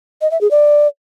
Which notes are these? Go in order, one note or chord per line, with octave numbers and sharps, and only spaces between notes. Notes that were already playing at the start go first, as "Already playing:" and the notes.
D#5
E5
G#4
D5